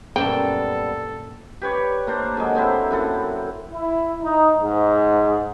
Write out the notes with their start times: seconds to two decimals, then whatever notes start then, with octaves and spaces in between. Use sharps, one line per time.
0.16 F#2 A#2 G3 B3 D4 A4 G5
1.61 G4 B4 C#5 D5
2.07 A#3 D4 C5
2.37 D3 F#3 G#3
2.55 A#3 C4 E4 C5
2.91 F#2 E4 A4 F#5
3.72 E4
4.23 D#4
4.57 G#2